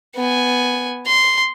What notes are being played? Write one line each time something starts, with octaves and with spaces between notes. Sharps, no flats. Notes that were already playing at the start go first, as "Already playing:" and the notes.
B3 G#5
C6